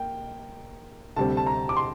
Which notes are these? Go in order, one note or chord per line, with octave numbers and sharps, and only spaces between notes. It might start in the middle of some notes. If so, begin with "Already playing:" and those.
Already playing: A#3 G5
D2 C3 G3 C4 A5
A5
A#5
D6
C6